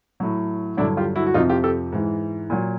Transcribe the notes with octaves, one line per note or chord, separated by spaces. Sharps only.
A2 F#3
G2 D3 F#3 D4 E4
F4 G4
E4 F#4
F#4
F2 C3 F3 D#4 F4
F4 G4
G4 A4
G#2 E3
A#2 F#3